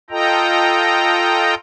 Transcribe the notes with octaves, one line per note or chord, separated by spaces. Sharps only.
F4 A4 D#5 G5 A#5